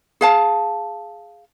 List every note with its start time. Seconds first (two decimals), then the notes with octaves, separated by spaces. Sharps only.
0.21 G#4 F5 A5